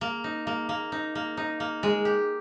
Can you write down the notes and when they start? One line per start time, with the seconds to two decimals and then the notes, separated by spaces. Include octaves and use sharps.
0.01 A#3
0.24 D#4
0.47 A#3
0.69 A#3
0.92 D#4
1.15 A#3
1.37 D#4
1.60 A#3
1.83 G#3
2.05 G4